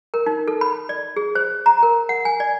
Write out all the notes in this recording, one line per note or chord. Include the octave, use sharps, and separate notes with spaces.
A#4
D#4
A4
B5
D5
G#4
C5
A#5
A#4
F#5
G#5
D5